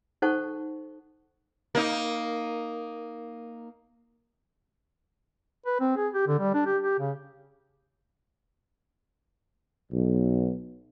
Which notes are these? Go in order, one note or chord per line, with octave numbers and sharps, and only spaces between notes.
D#4 A4 C5 F#5 A5 C#6
A#3 D#4
B4
C4
G#4
G4
D3
G3
D4
G4
G4
C#3
B1